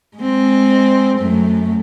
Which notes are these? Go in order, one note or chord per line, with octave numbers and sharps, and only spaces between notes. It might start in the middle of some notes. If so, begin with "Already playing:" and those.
G#3 C4
F#2 A3